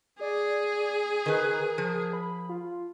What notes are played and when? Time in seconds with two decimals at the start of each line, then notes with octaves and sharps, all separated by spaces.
0.21 G#4 D5
1.26 D#3 A#4 B4
1.78 F3
2.13 B5
2.49 F4